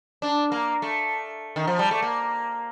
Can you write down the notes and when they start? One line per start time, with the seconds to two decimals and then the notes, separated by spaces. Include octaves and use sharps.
0.22 D4
0.52 A#3
0.82 A3
1.56 D#3
1.67 F3
1.79 G3
1.91 A3
2.02 A#3